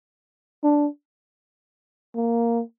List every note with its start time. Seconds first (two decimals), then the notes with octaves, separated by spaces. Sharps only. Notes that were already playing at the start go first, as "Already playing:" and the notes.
0.64 D4
2.16 A#3